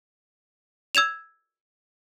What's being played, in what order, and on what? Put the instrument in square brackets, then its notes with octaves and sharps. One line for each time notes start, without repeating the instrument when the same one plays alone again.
[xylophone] E6 G#6 E7 F7